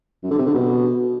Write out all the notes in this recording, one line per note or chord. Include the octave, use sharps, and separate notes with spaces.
F#2
D3
C3
D3
B2